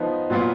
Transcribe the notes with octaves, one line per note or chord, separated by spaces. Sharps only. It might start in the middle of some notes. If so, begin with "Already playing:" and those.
Already playing: F3 B3 D#4
A#2 F#3 B3 F4